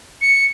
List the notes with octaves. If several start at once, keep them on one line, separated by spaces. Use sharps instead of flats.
C#7